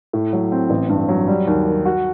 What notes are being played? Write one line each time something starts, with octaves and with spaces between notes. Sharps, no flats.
A2
F#3
C4
A1
G2
F#3
G3
D#2
D#3
F#4